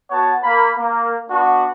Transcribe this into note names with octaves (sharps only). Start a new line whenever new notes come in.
B3 F#4 C#5 F#5 A5
A#3 B5
A#3
B3 D4 F#4